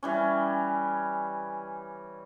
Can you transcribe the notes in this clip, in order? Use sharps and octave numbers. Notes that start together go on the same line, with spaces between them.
E3 G3 C#4